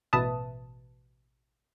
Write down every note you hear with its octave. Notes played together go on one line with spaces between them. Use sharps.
A1 B2 B4 E5 A5 D#6